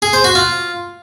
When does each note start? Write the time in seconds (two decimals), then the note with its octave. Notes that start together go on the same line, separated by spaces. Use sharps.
0.02 G#4
0.13 C5
0.24 F#4
0.35 F4